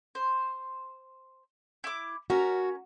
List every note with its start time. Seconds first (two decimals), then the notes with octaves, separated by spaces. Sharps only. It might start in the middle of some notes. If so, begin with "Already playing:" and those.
0.15 C5
1.84 E4 D6
2.30 C#4 F#4 A#4 A#5